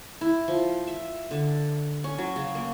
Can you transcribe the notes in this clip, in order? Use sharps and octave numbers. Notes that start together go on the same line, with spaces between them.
E4
F3
E5
D3
C#4
F#3
C#3
A#3